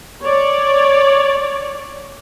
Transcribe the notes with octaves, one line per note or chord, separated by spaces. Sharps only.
C#5 D5